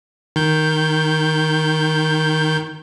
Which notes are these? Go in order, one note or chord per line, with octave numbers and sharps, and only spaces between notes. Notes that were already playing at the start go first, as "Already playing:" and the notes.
D#3 G6